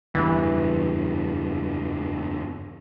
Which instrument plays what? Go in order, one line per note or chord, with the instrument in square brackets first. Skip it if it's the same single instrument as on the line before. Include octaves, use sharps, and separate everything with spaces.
[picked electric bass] F#1 E2 G2 [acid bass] E3